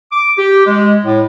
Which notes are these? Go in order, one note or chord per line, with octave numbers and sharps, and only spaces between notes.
D6
G4
G#3
A2